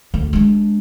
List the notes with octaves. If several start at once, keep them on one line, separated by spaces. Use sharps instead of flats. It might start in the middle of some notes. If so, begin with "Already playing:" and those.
D2
G#3 D4